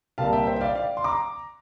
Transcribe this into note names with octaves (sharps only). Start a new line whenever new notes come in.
C2 A#2 G3 A#3 F5 A5
E5 G5
C5 E5
G5
D5 F5
D5 F5
C6
A#5 D6